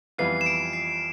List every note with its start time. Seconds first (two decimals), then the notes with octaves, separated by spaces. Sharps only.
0.18 F2 E3 G3 B3 F4 C7
0.41 E7
0.46 D7
0.73 C7